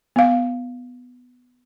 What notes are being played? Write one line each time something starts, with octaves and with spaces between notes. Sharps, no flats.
B3 F5